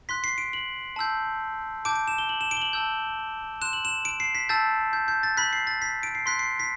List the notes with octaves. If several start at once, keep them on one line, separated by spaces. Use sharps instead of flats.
C6 F#6 B6
C7
D7
F#7
A5 E6 G6
A5 D6 G6 D7
D7
E7
G7
F#7
E7
D7
G7
F#7
A5 E6 G6
C6 F#6 E7
F#7
E7
D7
C7
B6
A5 E6 G6 A6
G6
G6
A6
B5 F#6 B6
C7
A6
B6
D7
C7
C6 F#6 B6
C7
B6